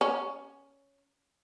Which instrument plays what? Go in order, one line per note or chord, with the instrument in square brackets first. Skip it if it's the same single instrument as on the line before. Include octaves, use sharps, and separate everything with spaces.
[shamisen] C#4